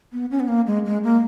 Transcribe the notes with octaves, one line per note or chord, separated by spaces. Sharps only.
B3
C#4
B3
A#3
G#3
G#3
A#3